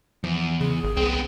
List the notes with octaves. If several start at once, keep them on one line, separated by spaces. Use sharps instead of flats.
E2 F3
C#3 G#4
G#1
C2 B3 C4